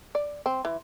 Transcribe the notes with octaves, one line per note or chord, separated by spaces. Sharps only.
D5
C4
E3